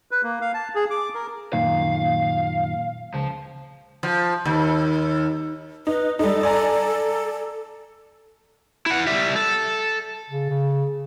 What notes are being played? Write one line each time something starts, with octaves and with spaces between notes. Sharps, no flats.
B4
A#3
F5
A5
G#4
D6
A#4
F#2 A#2 D#3 F5
C#2 F3
F3
D#2
D#4 B4
G3 D#4 A4
D5 G#5 A#5
E4 F#5
G3 E5
A4
C#3
C#3